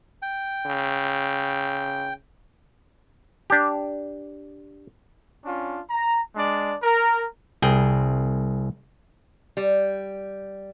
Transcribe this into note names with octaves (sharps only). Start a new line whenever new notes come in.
G5
C#3
D4 G4
C#4 D4 F4
A#5
G#3 D4 D5
A#4
C2 G#4 G5
G3